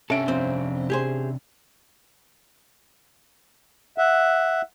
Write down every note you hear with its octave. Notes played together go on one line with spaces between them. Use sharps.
C3 C#4 D4 A4 E5 D7
F2 C4
G4 G#4 C5
E5 F#5